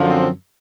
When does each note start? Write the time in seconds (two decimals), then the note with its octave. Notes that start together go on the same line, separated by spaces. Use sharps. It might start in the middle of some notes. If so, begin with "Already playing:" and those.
Already playing: F#2 D3 F3
0.08 C4